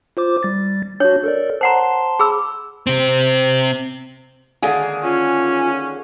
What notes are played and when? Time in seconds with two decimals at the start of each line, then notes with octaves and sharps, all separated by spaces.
0.17 F4 C5 D6
0.43 G3 A6
1.00 D4 F#4 C#5
1.24 A4 A#4 D5
1.61 C5 F#5 A5 A#5 C6
2.19 G#4 B5 E6
2.87 C3 C4
4.63 D3 D#3 A#3 G#4
5.03 C#4 F4